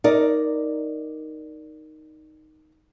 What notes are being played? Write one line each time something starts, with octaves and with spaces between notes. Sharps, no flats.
D#4 A#4 D5